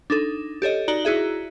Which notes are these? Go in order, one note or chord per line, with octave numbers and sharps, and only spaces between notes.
D4 D#4 A4
G4 A4 C#5 D#5
D#4 F#4 D5 A#5 F#7 G7
E4 F#4 G#4 E5